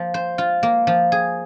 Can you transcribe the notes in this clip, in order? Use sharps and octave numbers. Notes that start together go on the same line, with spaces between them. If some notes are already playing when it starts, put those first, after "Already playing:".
Already playing: F3 A#3
C5
F4
A#3
F3
G#4